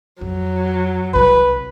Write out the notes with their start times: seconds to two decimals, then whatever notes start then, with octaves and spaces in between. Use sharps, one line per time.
0.21 F2 F#3
1.14 C2 C3 B4